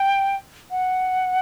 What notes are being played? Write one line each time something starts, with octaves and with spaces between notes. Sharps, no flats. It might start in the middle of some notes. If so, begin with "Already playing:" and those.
Already playing: G5
F#5